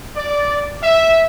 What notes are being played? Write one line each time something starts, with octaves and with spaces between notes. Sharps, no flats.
D5
E5